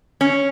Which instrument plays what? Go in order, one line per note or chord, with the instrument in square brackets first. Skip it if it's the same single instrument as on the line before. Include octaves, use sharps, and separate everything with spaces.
[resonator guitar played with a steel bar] C#4